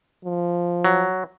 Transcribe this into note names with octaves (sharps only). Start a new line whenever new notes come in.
F3
F#3